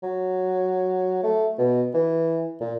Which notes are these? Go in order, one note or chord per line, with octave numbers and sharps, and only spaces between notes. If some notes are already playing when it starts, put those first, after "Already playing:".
F#3
A3
B2
E3
A#2